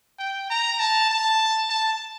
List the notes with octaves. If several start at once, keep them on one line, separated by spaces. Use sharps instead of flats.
G5
A#5
A5
A5
A5